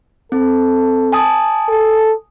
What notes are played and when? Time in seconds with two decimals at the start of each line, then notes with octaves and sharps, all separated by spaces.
0.32 C4 A4
1.12 G#5 A5 D#6
1.69 A4